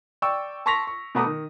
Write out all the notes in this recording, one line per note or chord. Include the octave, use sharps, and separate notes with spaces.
D5 G5 C#6 E6
A5 C6 C#6 A#6 B6 F7
C#6
B2 A3 B3 A#5 D6 D#6
D#3